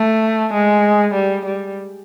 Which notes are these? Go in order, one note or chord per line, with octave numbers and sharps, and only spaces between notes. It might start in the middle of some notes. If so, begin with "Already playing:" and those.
Already playing: A3
G#3
G3
G3